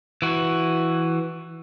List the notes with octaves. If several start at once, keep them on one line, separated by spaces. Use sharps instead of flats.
E3 F#4